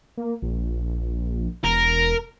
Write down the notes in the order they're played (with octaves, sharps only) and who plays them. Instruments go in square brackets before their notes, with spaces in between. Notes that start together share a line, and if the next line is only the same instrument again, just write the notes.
[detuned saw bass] A#3
A#1
[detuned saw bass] E1 [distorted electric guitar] A#4